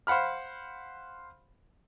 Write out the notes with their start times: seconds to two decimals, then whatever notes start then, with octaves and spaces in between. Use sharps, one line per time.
0.07 C5 F5 F#5 B5 F6